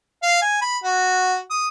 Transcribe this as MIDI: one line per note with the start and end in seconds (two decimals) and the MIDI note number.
0.23 0.41 77
0.42 0.61 80
0.61 0.78 83
0.84 1.37 66
1.50 1.67 87